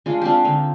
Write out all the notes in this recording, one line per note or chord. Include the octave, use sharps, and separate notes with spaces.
G#3 D4 F4
C4 D4 F4 G4
D3 D#4